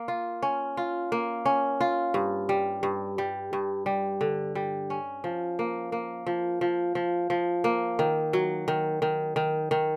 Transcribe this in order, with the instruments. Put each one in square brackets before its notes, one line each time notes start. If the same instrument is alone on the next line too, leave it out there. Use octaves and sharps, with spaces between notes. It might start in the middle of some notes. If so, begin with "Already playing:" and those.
Already playing: [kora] A#3
F4
C#4
F4
A#3
C#4
F4
G2
G3
G2
G3
G2
G3
D3
G3
C#4
F3
A#3
A#3
F3
F3
F3
F3
A#3
D#3
F#3
D#3
D#3
D#3
D#3